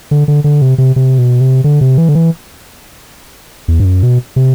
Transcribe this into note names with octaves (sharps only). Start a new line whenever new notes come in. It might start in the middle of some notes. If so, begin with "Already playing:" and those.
D3
D3
D3
C3
C3
C3
B2
C3
D3
C3
E3
D3
E3
E2
G2
F#2
B2
C3